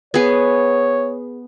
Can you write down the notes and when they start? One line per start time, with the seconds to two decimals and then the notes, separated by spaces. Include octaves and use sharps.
0.14 B3 G#4 C#5